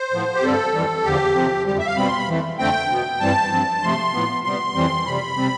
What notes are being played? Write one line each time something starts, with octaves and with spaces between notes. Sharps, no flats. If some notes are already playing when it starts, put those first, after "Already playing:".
Already playing: C5
A2 F3 B3
G4
G2 D3 G3 C4 A4
F2 E3 G3
E2 D3 F3 G4
C3 F3 C4
F2 D3 G3 G4
E5
F5
B2 G3 C4 B5
C6
B5
F2 E3 A3
F2 D3 A3 C4 G5
B2 B3
G2 E3 G3 C4 A5
G2 F3 C4
C3 F3 A3 C6
A2 F3 B3
C3 G3 B3 C6
F2 E3 G3 C4
F2 C3 G3 B5
C3 G3 C4